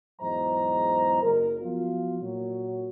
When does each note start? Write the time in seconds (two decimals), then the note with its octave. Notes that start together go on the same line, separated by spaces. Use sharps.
0.21 E2 G#2 F#3 C5 D#5 A#5
1.22 F#1 A#4
1.62 F3 F#3 B3 F4
2.21 A#2 F#3